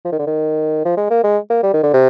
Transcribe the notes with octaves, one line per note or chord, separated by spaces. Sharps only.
F3
D#3
D3
D#3
F3
G#3
A#3
G#3
A#3
G3
D#3
D3
C3